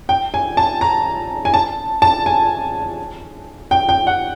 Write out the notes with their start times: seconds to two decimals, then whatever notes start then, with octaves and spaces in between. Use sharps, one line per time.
0.09 G5
0.34 G#5
0.57 A5
0.81 A#5
1.45 G#5
1.54 A5
2.02 A5
2.26 G#5
3.71 G5
3.89 G5
4.07 F#5